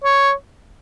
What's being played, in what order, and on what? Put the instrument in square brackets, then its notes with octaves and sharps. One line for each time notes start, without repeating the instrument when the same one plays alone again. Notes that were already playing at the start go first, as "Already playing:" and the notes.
[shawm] C#5